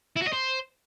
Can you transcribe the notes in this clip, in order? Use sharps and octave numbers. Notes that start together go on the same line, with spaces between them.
E4
F#4
D#5
C5